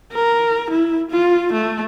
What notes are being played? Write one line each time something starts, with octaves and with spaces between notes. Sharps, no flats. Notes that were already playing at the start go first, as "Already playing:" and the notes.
A#4
E4
F4
A3